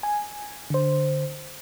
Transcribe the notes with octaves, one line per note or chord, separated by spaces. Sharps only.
G#5
D3 C5